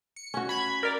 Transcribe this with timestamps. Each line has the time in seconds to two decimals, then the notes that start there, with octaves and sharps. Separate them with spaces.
0.16 C#7
0.34 C#4 F#4
0.49 B5 G#6
0.83 A#4 D5